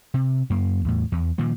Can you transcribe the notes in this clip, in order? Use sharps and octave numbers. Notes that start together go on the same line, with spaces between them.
C3
F#2 A#3
E2 A2
E2
A#2 D#3 F3